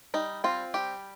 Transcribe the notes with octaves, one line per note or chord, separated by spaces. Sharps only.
G3 D#4
C4 F4
G3 G4